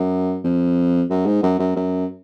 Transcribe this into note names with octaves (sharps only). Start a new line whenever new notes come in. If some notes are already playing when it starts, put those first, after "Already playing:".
Already playing: F#2
F2
F#2
G#2
F#2
F#2
F#2